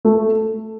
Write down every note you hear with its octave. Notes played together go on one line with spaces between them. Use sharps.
A3